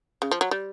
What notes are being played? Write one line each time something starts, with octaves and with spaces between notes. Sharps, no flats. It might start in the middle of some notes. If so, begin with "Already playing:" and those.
C#3
F3
F#3
G3